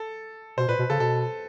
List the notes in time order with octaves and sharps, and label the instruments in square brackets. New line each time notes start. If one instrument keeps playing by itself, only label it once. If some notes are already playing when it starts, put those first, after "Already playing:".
Already playing: [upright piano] A4
[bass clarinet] B2 [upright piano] C5
[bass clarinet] A#2 [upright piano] B4
[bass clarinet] B2
[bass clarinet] C#3 [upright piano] A4
[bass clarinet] B2 [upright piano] A4